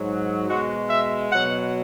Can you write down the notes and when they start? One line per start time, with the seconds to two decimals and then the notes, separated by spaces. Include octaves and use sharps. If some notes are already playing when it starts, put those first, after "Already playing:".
Already playing: G#2 F#3
0.48 B2 G#3 F#4
0.90 E5
1.32 B2 F#3 F#5